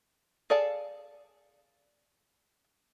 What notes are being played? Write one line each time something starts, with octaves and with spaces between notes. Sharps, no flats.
G#4 A4 D5 F5 A5